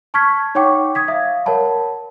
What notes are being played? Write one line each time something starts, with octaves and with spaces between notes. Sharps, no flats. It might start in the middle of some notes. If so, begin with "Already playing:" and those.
A5 C#6 F6 G#6 B6
D#4 C#5 F#5 G5 C#6 D6
D#6 G#6 B6
E5 F5
A#4 C#5 F#5 A5 B5